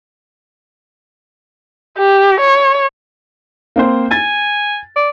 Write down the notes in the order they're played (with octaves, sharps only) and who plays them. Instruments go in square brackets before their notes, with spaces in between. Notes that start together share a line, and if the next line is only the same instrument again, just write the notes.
[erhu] G4
C#5
[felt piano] A#3 C4 C5
[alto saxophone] G#5 [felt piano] A6
[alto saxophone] D5